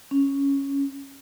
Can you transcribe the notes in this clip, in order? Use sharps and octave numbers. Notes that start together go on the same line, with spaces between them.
C#4